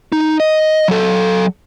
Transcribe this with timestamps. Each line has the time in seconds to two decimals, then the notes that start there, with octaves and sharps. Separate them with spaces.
0.12 D#4
0.40 D#5
0.88 F#3 A4